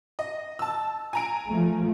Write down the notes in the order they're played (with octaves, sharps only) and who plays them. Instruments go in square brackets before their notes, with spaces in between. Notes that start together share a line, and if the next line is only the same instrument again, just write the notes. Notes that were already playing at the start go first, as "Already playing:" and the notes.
[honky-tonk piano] D#5
A5 E6
G#5 A#5 D7
[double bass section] F3 A3